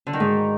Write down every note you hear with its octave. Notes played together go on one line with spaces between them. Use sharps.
D3
D#3
G#2